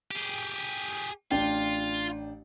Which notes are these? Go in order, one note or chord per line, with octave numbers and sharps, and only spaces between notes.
G4 G#4
A1 D4 F4 G5